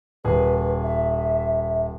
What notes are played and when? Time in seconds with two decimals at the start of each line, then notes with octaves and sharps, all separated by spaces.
0.25 D#1 G#4 B4
0.83 E5